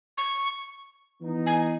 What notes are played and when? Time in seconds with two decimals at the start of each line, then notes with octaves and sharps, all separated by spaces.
0.18 C#6
1.21 E3 B3 D#4
1.46 G#5